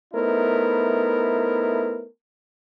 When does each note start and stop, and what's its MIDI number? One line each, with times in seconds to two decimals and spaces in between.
0.13 2.06 57
0.13 2.06 59
0.13 2.06 63
0.13 2.06 64
0.13 2.06 70
0.13 2.06 72